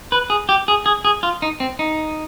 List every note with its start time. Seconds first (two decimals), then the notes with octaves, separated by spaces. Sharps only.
0.12 B4
0.30 G#4
0.49 G4
0.68 G#4
0.86 G#4
1.05 G#4
1.23 F4
1.42 D#4
1.60 C4
1.79 D#4